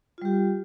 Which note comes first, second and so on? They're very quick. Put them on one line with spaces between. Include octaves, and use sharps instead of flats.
F4 G3 G4